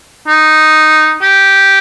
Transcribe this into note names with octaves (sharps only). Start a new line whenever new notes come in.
D#4
G4